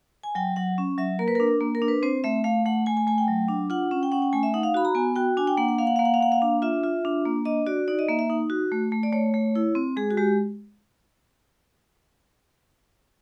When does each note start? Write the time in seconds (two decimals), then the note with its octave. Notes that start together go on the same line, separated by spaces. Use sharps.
0.23 G#5
0.35 F#3 G5
0.56 F#3 F#5
0.78 C#4
0.98 F#3 E5
1.19 A#3 A#4
1.28 B4
1.35 D4 A#4
1.61 A#3
1.75 A#4
1.82 D4
1.88 B4
2.03 C4 C5
2.24 A3 E5
2.44 A3 F5
2.65 A3 F#5
2.86 A3 G#5
2.97 G#5
3.07 A3 G#5
3.18 G5
3.28 F#3
3.48 D4
3.70 F4 F#5
3.91 C#4
4.03 G5
4.12 C#4 F#5
4.22 G5
4.33 A3 G#5
4.43 E5
4.54 D#4 F#5
4.63 F5
4.74 F#4 B5
4.85 A#5
4.95 B3 G#5
5.16 F#4 G5
5.37 D4 G#5
5.47 G5
5.57 A#3 F#5
5.68 F#5
5.78 A#3 F5
5.87 F#5
5.96 A#3 F5
6.05 F#5
6.14 F5
6.20 A#3 F#5
6.32 F5
6.42 D4
6.62 F4 E5
6.84 F4
7.05 D4
7.25 A#3
7.45 D4 D#5
7.67 F#4 D5
7.88 D#4 D5
7.99 D#5
8.09 A#3 E5
8.19 E5
8.30 D#4
8.50 F#4
8.72 A3
8.92 A3
9.03 D5
9.13 A3 C#5
9.34 A3
9.55 E4
9.75 C4
9.97 G#3 G#4
10.11 F#4
10.17 G#3 G4